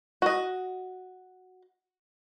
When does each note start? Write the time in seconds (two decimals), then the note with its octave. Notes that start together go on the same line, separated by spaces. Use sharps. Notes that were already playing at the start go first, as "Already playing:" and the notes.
0.22 F#4 D#5